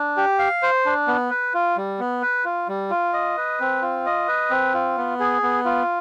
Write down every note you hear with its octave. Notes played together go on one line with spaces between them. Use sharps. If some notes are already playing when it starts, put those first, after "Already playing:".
Already playing: D4
G4
F5
C5
D4
B3
B4
F4
G3
B3
B4
F4
G3
F4
D#5
B4
C4
F4
D#5
B4
C4
F4
B3
G#4
B3
F4